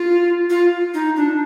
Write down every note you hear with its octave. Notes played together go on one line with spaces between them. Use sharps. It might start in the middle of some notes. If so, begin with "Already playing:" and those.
Already playing: F4
F4
D#4
D4